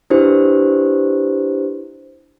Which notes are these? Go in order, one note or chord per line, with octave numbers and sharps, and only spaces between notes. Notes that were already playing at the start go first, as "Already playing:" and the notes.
D4 E4 G4 B4 C5